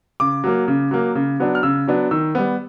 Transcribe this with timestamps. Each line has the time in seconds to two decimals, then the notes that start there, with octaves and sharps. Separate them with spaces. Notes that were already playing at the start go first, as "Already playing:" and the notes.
0.20 C#3 D6
0.44 F#3 A#3
0.68 C#3
0.91 F#3 A#3
1.15 C#3
1.40 F#3 B3 D4
1.55 F6
1.63 C#3 E6
1.87 F#3 B3 D4
2.11 D#3 E6
2.35 G3 B3